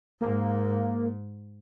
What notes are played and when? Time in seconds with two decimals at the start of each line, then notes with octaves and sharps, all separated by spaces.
0.21 G#2 A#3